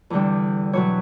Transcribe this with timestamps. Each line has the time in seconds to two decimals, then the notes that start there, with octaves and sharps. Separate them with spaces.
0.10 E2 D3 G3
0.73 E2 B2 F#3 C#5